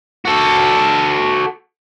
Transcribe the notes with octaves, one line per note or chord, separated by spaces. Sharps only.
F#4 A4